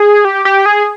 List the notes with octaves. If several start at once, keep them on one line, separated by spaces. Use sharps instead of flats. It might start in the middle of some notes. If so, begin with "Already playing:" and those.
Already playing: G#4
G4
G4
G#4